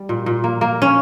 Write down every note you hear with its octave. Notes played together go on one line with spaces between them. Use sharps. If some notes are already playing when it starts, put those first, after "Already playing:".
Already playing: G3
A#2
A#2
A#3
A#3
C#4